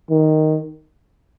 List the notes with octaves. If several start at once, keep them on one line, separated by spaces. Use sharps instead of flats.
D#3